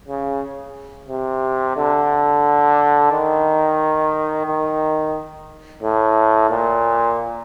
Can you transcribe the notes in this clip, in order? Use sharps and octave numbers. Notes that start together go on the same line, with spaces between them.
C#3
C3
D3
D#3
D#3
A2
A#2